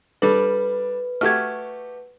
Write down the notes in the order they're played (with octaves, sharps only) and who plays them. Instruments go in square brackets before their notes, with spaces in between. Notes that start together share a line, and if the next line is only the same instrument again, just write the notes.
[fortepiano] G3 D4 [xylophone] A4 [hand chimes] B4
[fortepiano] A3 F#4 G4 [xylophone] F6 G#6